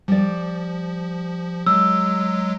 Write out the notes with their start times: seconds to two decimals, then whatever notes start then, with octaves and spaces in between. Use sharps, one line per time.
0.08 F3 G3 D5
1.66 F#3 G#3 E6